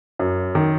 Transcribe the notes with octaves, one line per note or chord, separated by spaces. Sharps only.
F#2
D#3